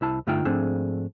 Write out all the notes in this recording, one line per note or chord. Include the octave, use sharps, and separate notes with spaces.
C2 E4 A5
G2 D3 A3 D#4 F4 G5
G#2 F3 A3 C4 D4 G#4